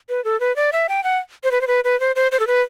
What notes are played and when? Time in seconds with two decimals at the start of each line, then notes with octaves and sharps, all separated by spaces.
0.09 B4
0.24 A4
0.40 B4
0.56 D5
0.72 E5
0.89 G5
1.04 F#5
1.44 C5
1.51 B4
1.61 C5
1.67 B4
1.84 B4
2.00 C5
2.16 C5
2.32 C5
2.40 A4
2.47 B4